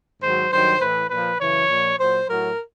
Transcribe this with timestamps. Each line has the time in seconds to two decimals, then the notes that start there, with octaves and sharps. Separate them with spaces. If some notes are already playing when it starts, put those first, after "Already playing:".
0.22 G#2 D#3 F#3 C5
0.51 G2 D#3 F#3 C5
0.80 A2 E3 B4
1.10 A#2 F3 B4
1.39 F#2 C#3 E3 C#5
1.68 A#2 F3
1.98 A#2 F#3 C5
2.27 A2 F#3 A#4